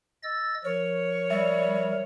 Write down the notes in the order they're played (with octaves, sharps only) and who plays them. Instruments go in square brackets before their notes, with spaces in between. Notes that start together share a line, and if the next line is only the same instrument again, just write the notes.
[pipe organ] D#5 E6 A6
[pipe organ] F3 A#4 [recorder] C#5
[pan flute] G3 [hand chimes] E5